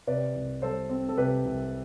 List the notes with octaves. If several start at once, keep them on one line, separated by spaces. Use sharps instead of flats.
C3 B4 D5
C2
G3 A4 C5
C4
A4
C3 G4 B4
C2